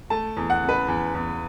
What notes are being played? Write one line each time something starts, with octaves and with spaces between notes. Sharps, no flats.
A3 A5
E2
F#5
C#3
B4
E2
E2